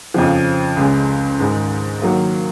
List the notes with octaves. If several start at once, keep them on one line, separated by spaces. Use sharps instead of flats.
F2 C#3 F3
C#2 C#3 G#3
G#2 D#3 G#3 D#4
D#3 F#3 A#3